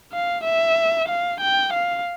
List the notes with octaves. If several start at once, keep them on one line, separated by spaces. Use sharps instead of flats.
F5
E5
F5
G5
F5